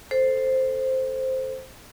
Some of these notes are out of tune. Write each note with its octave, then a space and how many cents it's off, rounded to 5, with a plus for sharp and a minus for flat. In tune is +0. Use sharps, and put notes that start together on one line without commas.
A4 +0 C5 +0